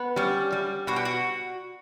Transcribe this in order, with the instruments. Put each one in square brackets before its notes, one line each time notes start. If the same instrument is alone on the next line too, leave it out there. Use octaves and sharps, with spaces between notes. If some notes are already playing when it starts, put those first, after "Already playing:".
Already playing: [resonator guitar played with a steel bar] B3
[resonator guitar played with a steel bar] G3 [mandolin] C#4
[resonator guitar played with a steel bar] G3
[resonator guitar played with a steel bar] B2 [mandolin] F#4
[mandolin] G4
F#4